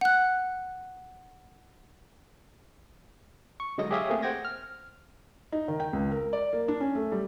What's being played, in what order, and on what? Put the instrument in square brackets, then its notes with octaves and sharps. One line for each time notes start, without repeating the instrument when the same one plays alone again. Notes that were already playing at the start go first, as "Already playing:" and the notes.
[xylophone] F#5 F#6
[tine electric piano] C#6
D3 F#3 G#3 D#5 A#6
G4 G#4 C#5 E5 F5 D#6
A3 A#3 C4 G#4
C5 F#5 G5 G#6 A#6
F6
[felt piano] D#4
D#3
G5
C#2
A#4
D5
A#3
D4
C#4
A3
G3